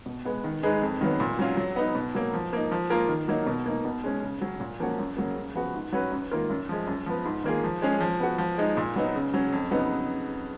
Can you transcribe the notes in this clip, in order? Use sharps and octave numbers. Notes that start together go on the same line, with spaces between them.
B2
G#3 B3
D#3
G#3 D#4 G#4 B4
F2
D#3 F#3 B3
A#2
F#3 C#4 F4
F#3
B3 D#4
B2
F#3 A#3
F3
A#3 D#4
F3
A#3 F4 A#4
D#3
F#3 A#3 D#4
B2
A#3 D#4
B2
G#3 C#4
C#3
F#3 C#4
A#2
F3 A#3 C#4 F#4
F#2
C#3 F#3 A#3
C#3
F3 B3 F#4
G#2
F#3 C#4 F#4 B4
F#2
D#3 A#3 F4 A#4
F#2
F3 G#3
F#2
F3 B3
G#2
D#3 A#3 F4 G#4
F3
G#3 C#4 G#4
F3
B3 F#4
F3
G#3 D#4
A#2
F#3 B3 D#4
C#3
F#3 C#4
F2
C#3 F#3 B3 D#4